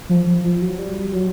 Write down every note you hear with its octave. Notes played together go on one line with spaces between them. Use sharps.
F3
F3
F3
F#3
G3
F#3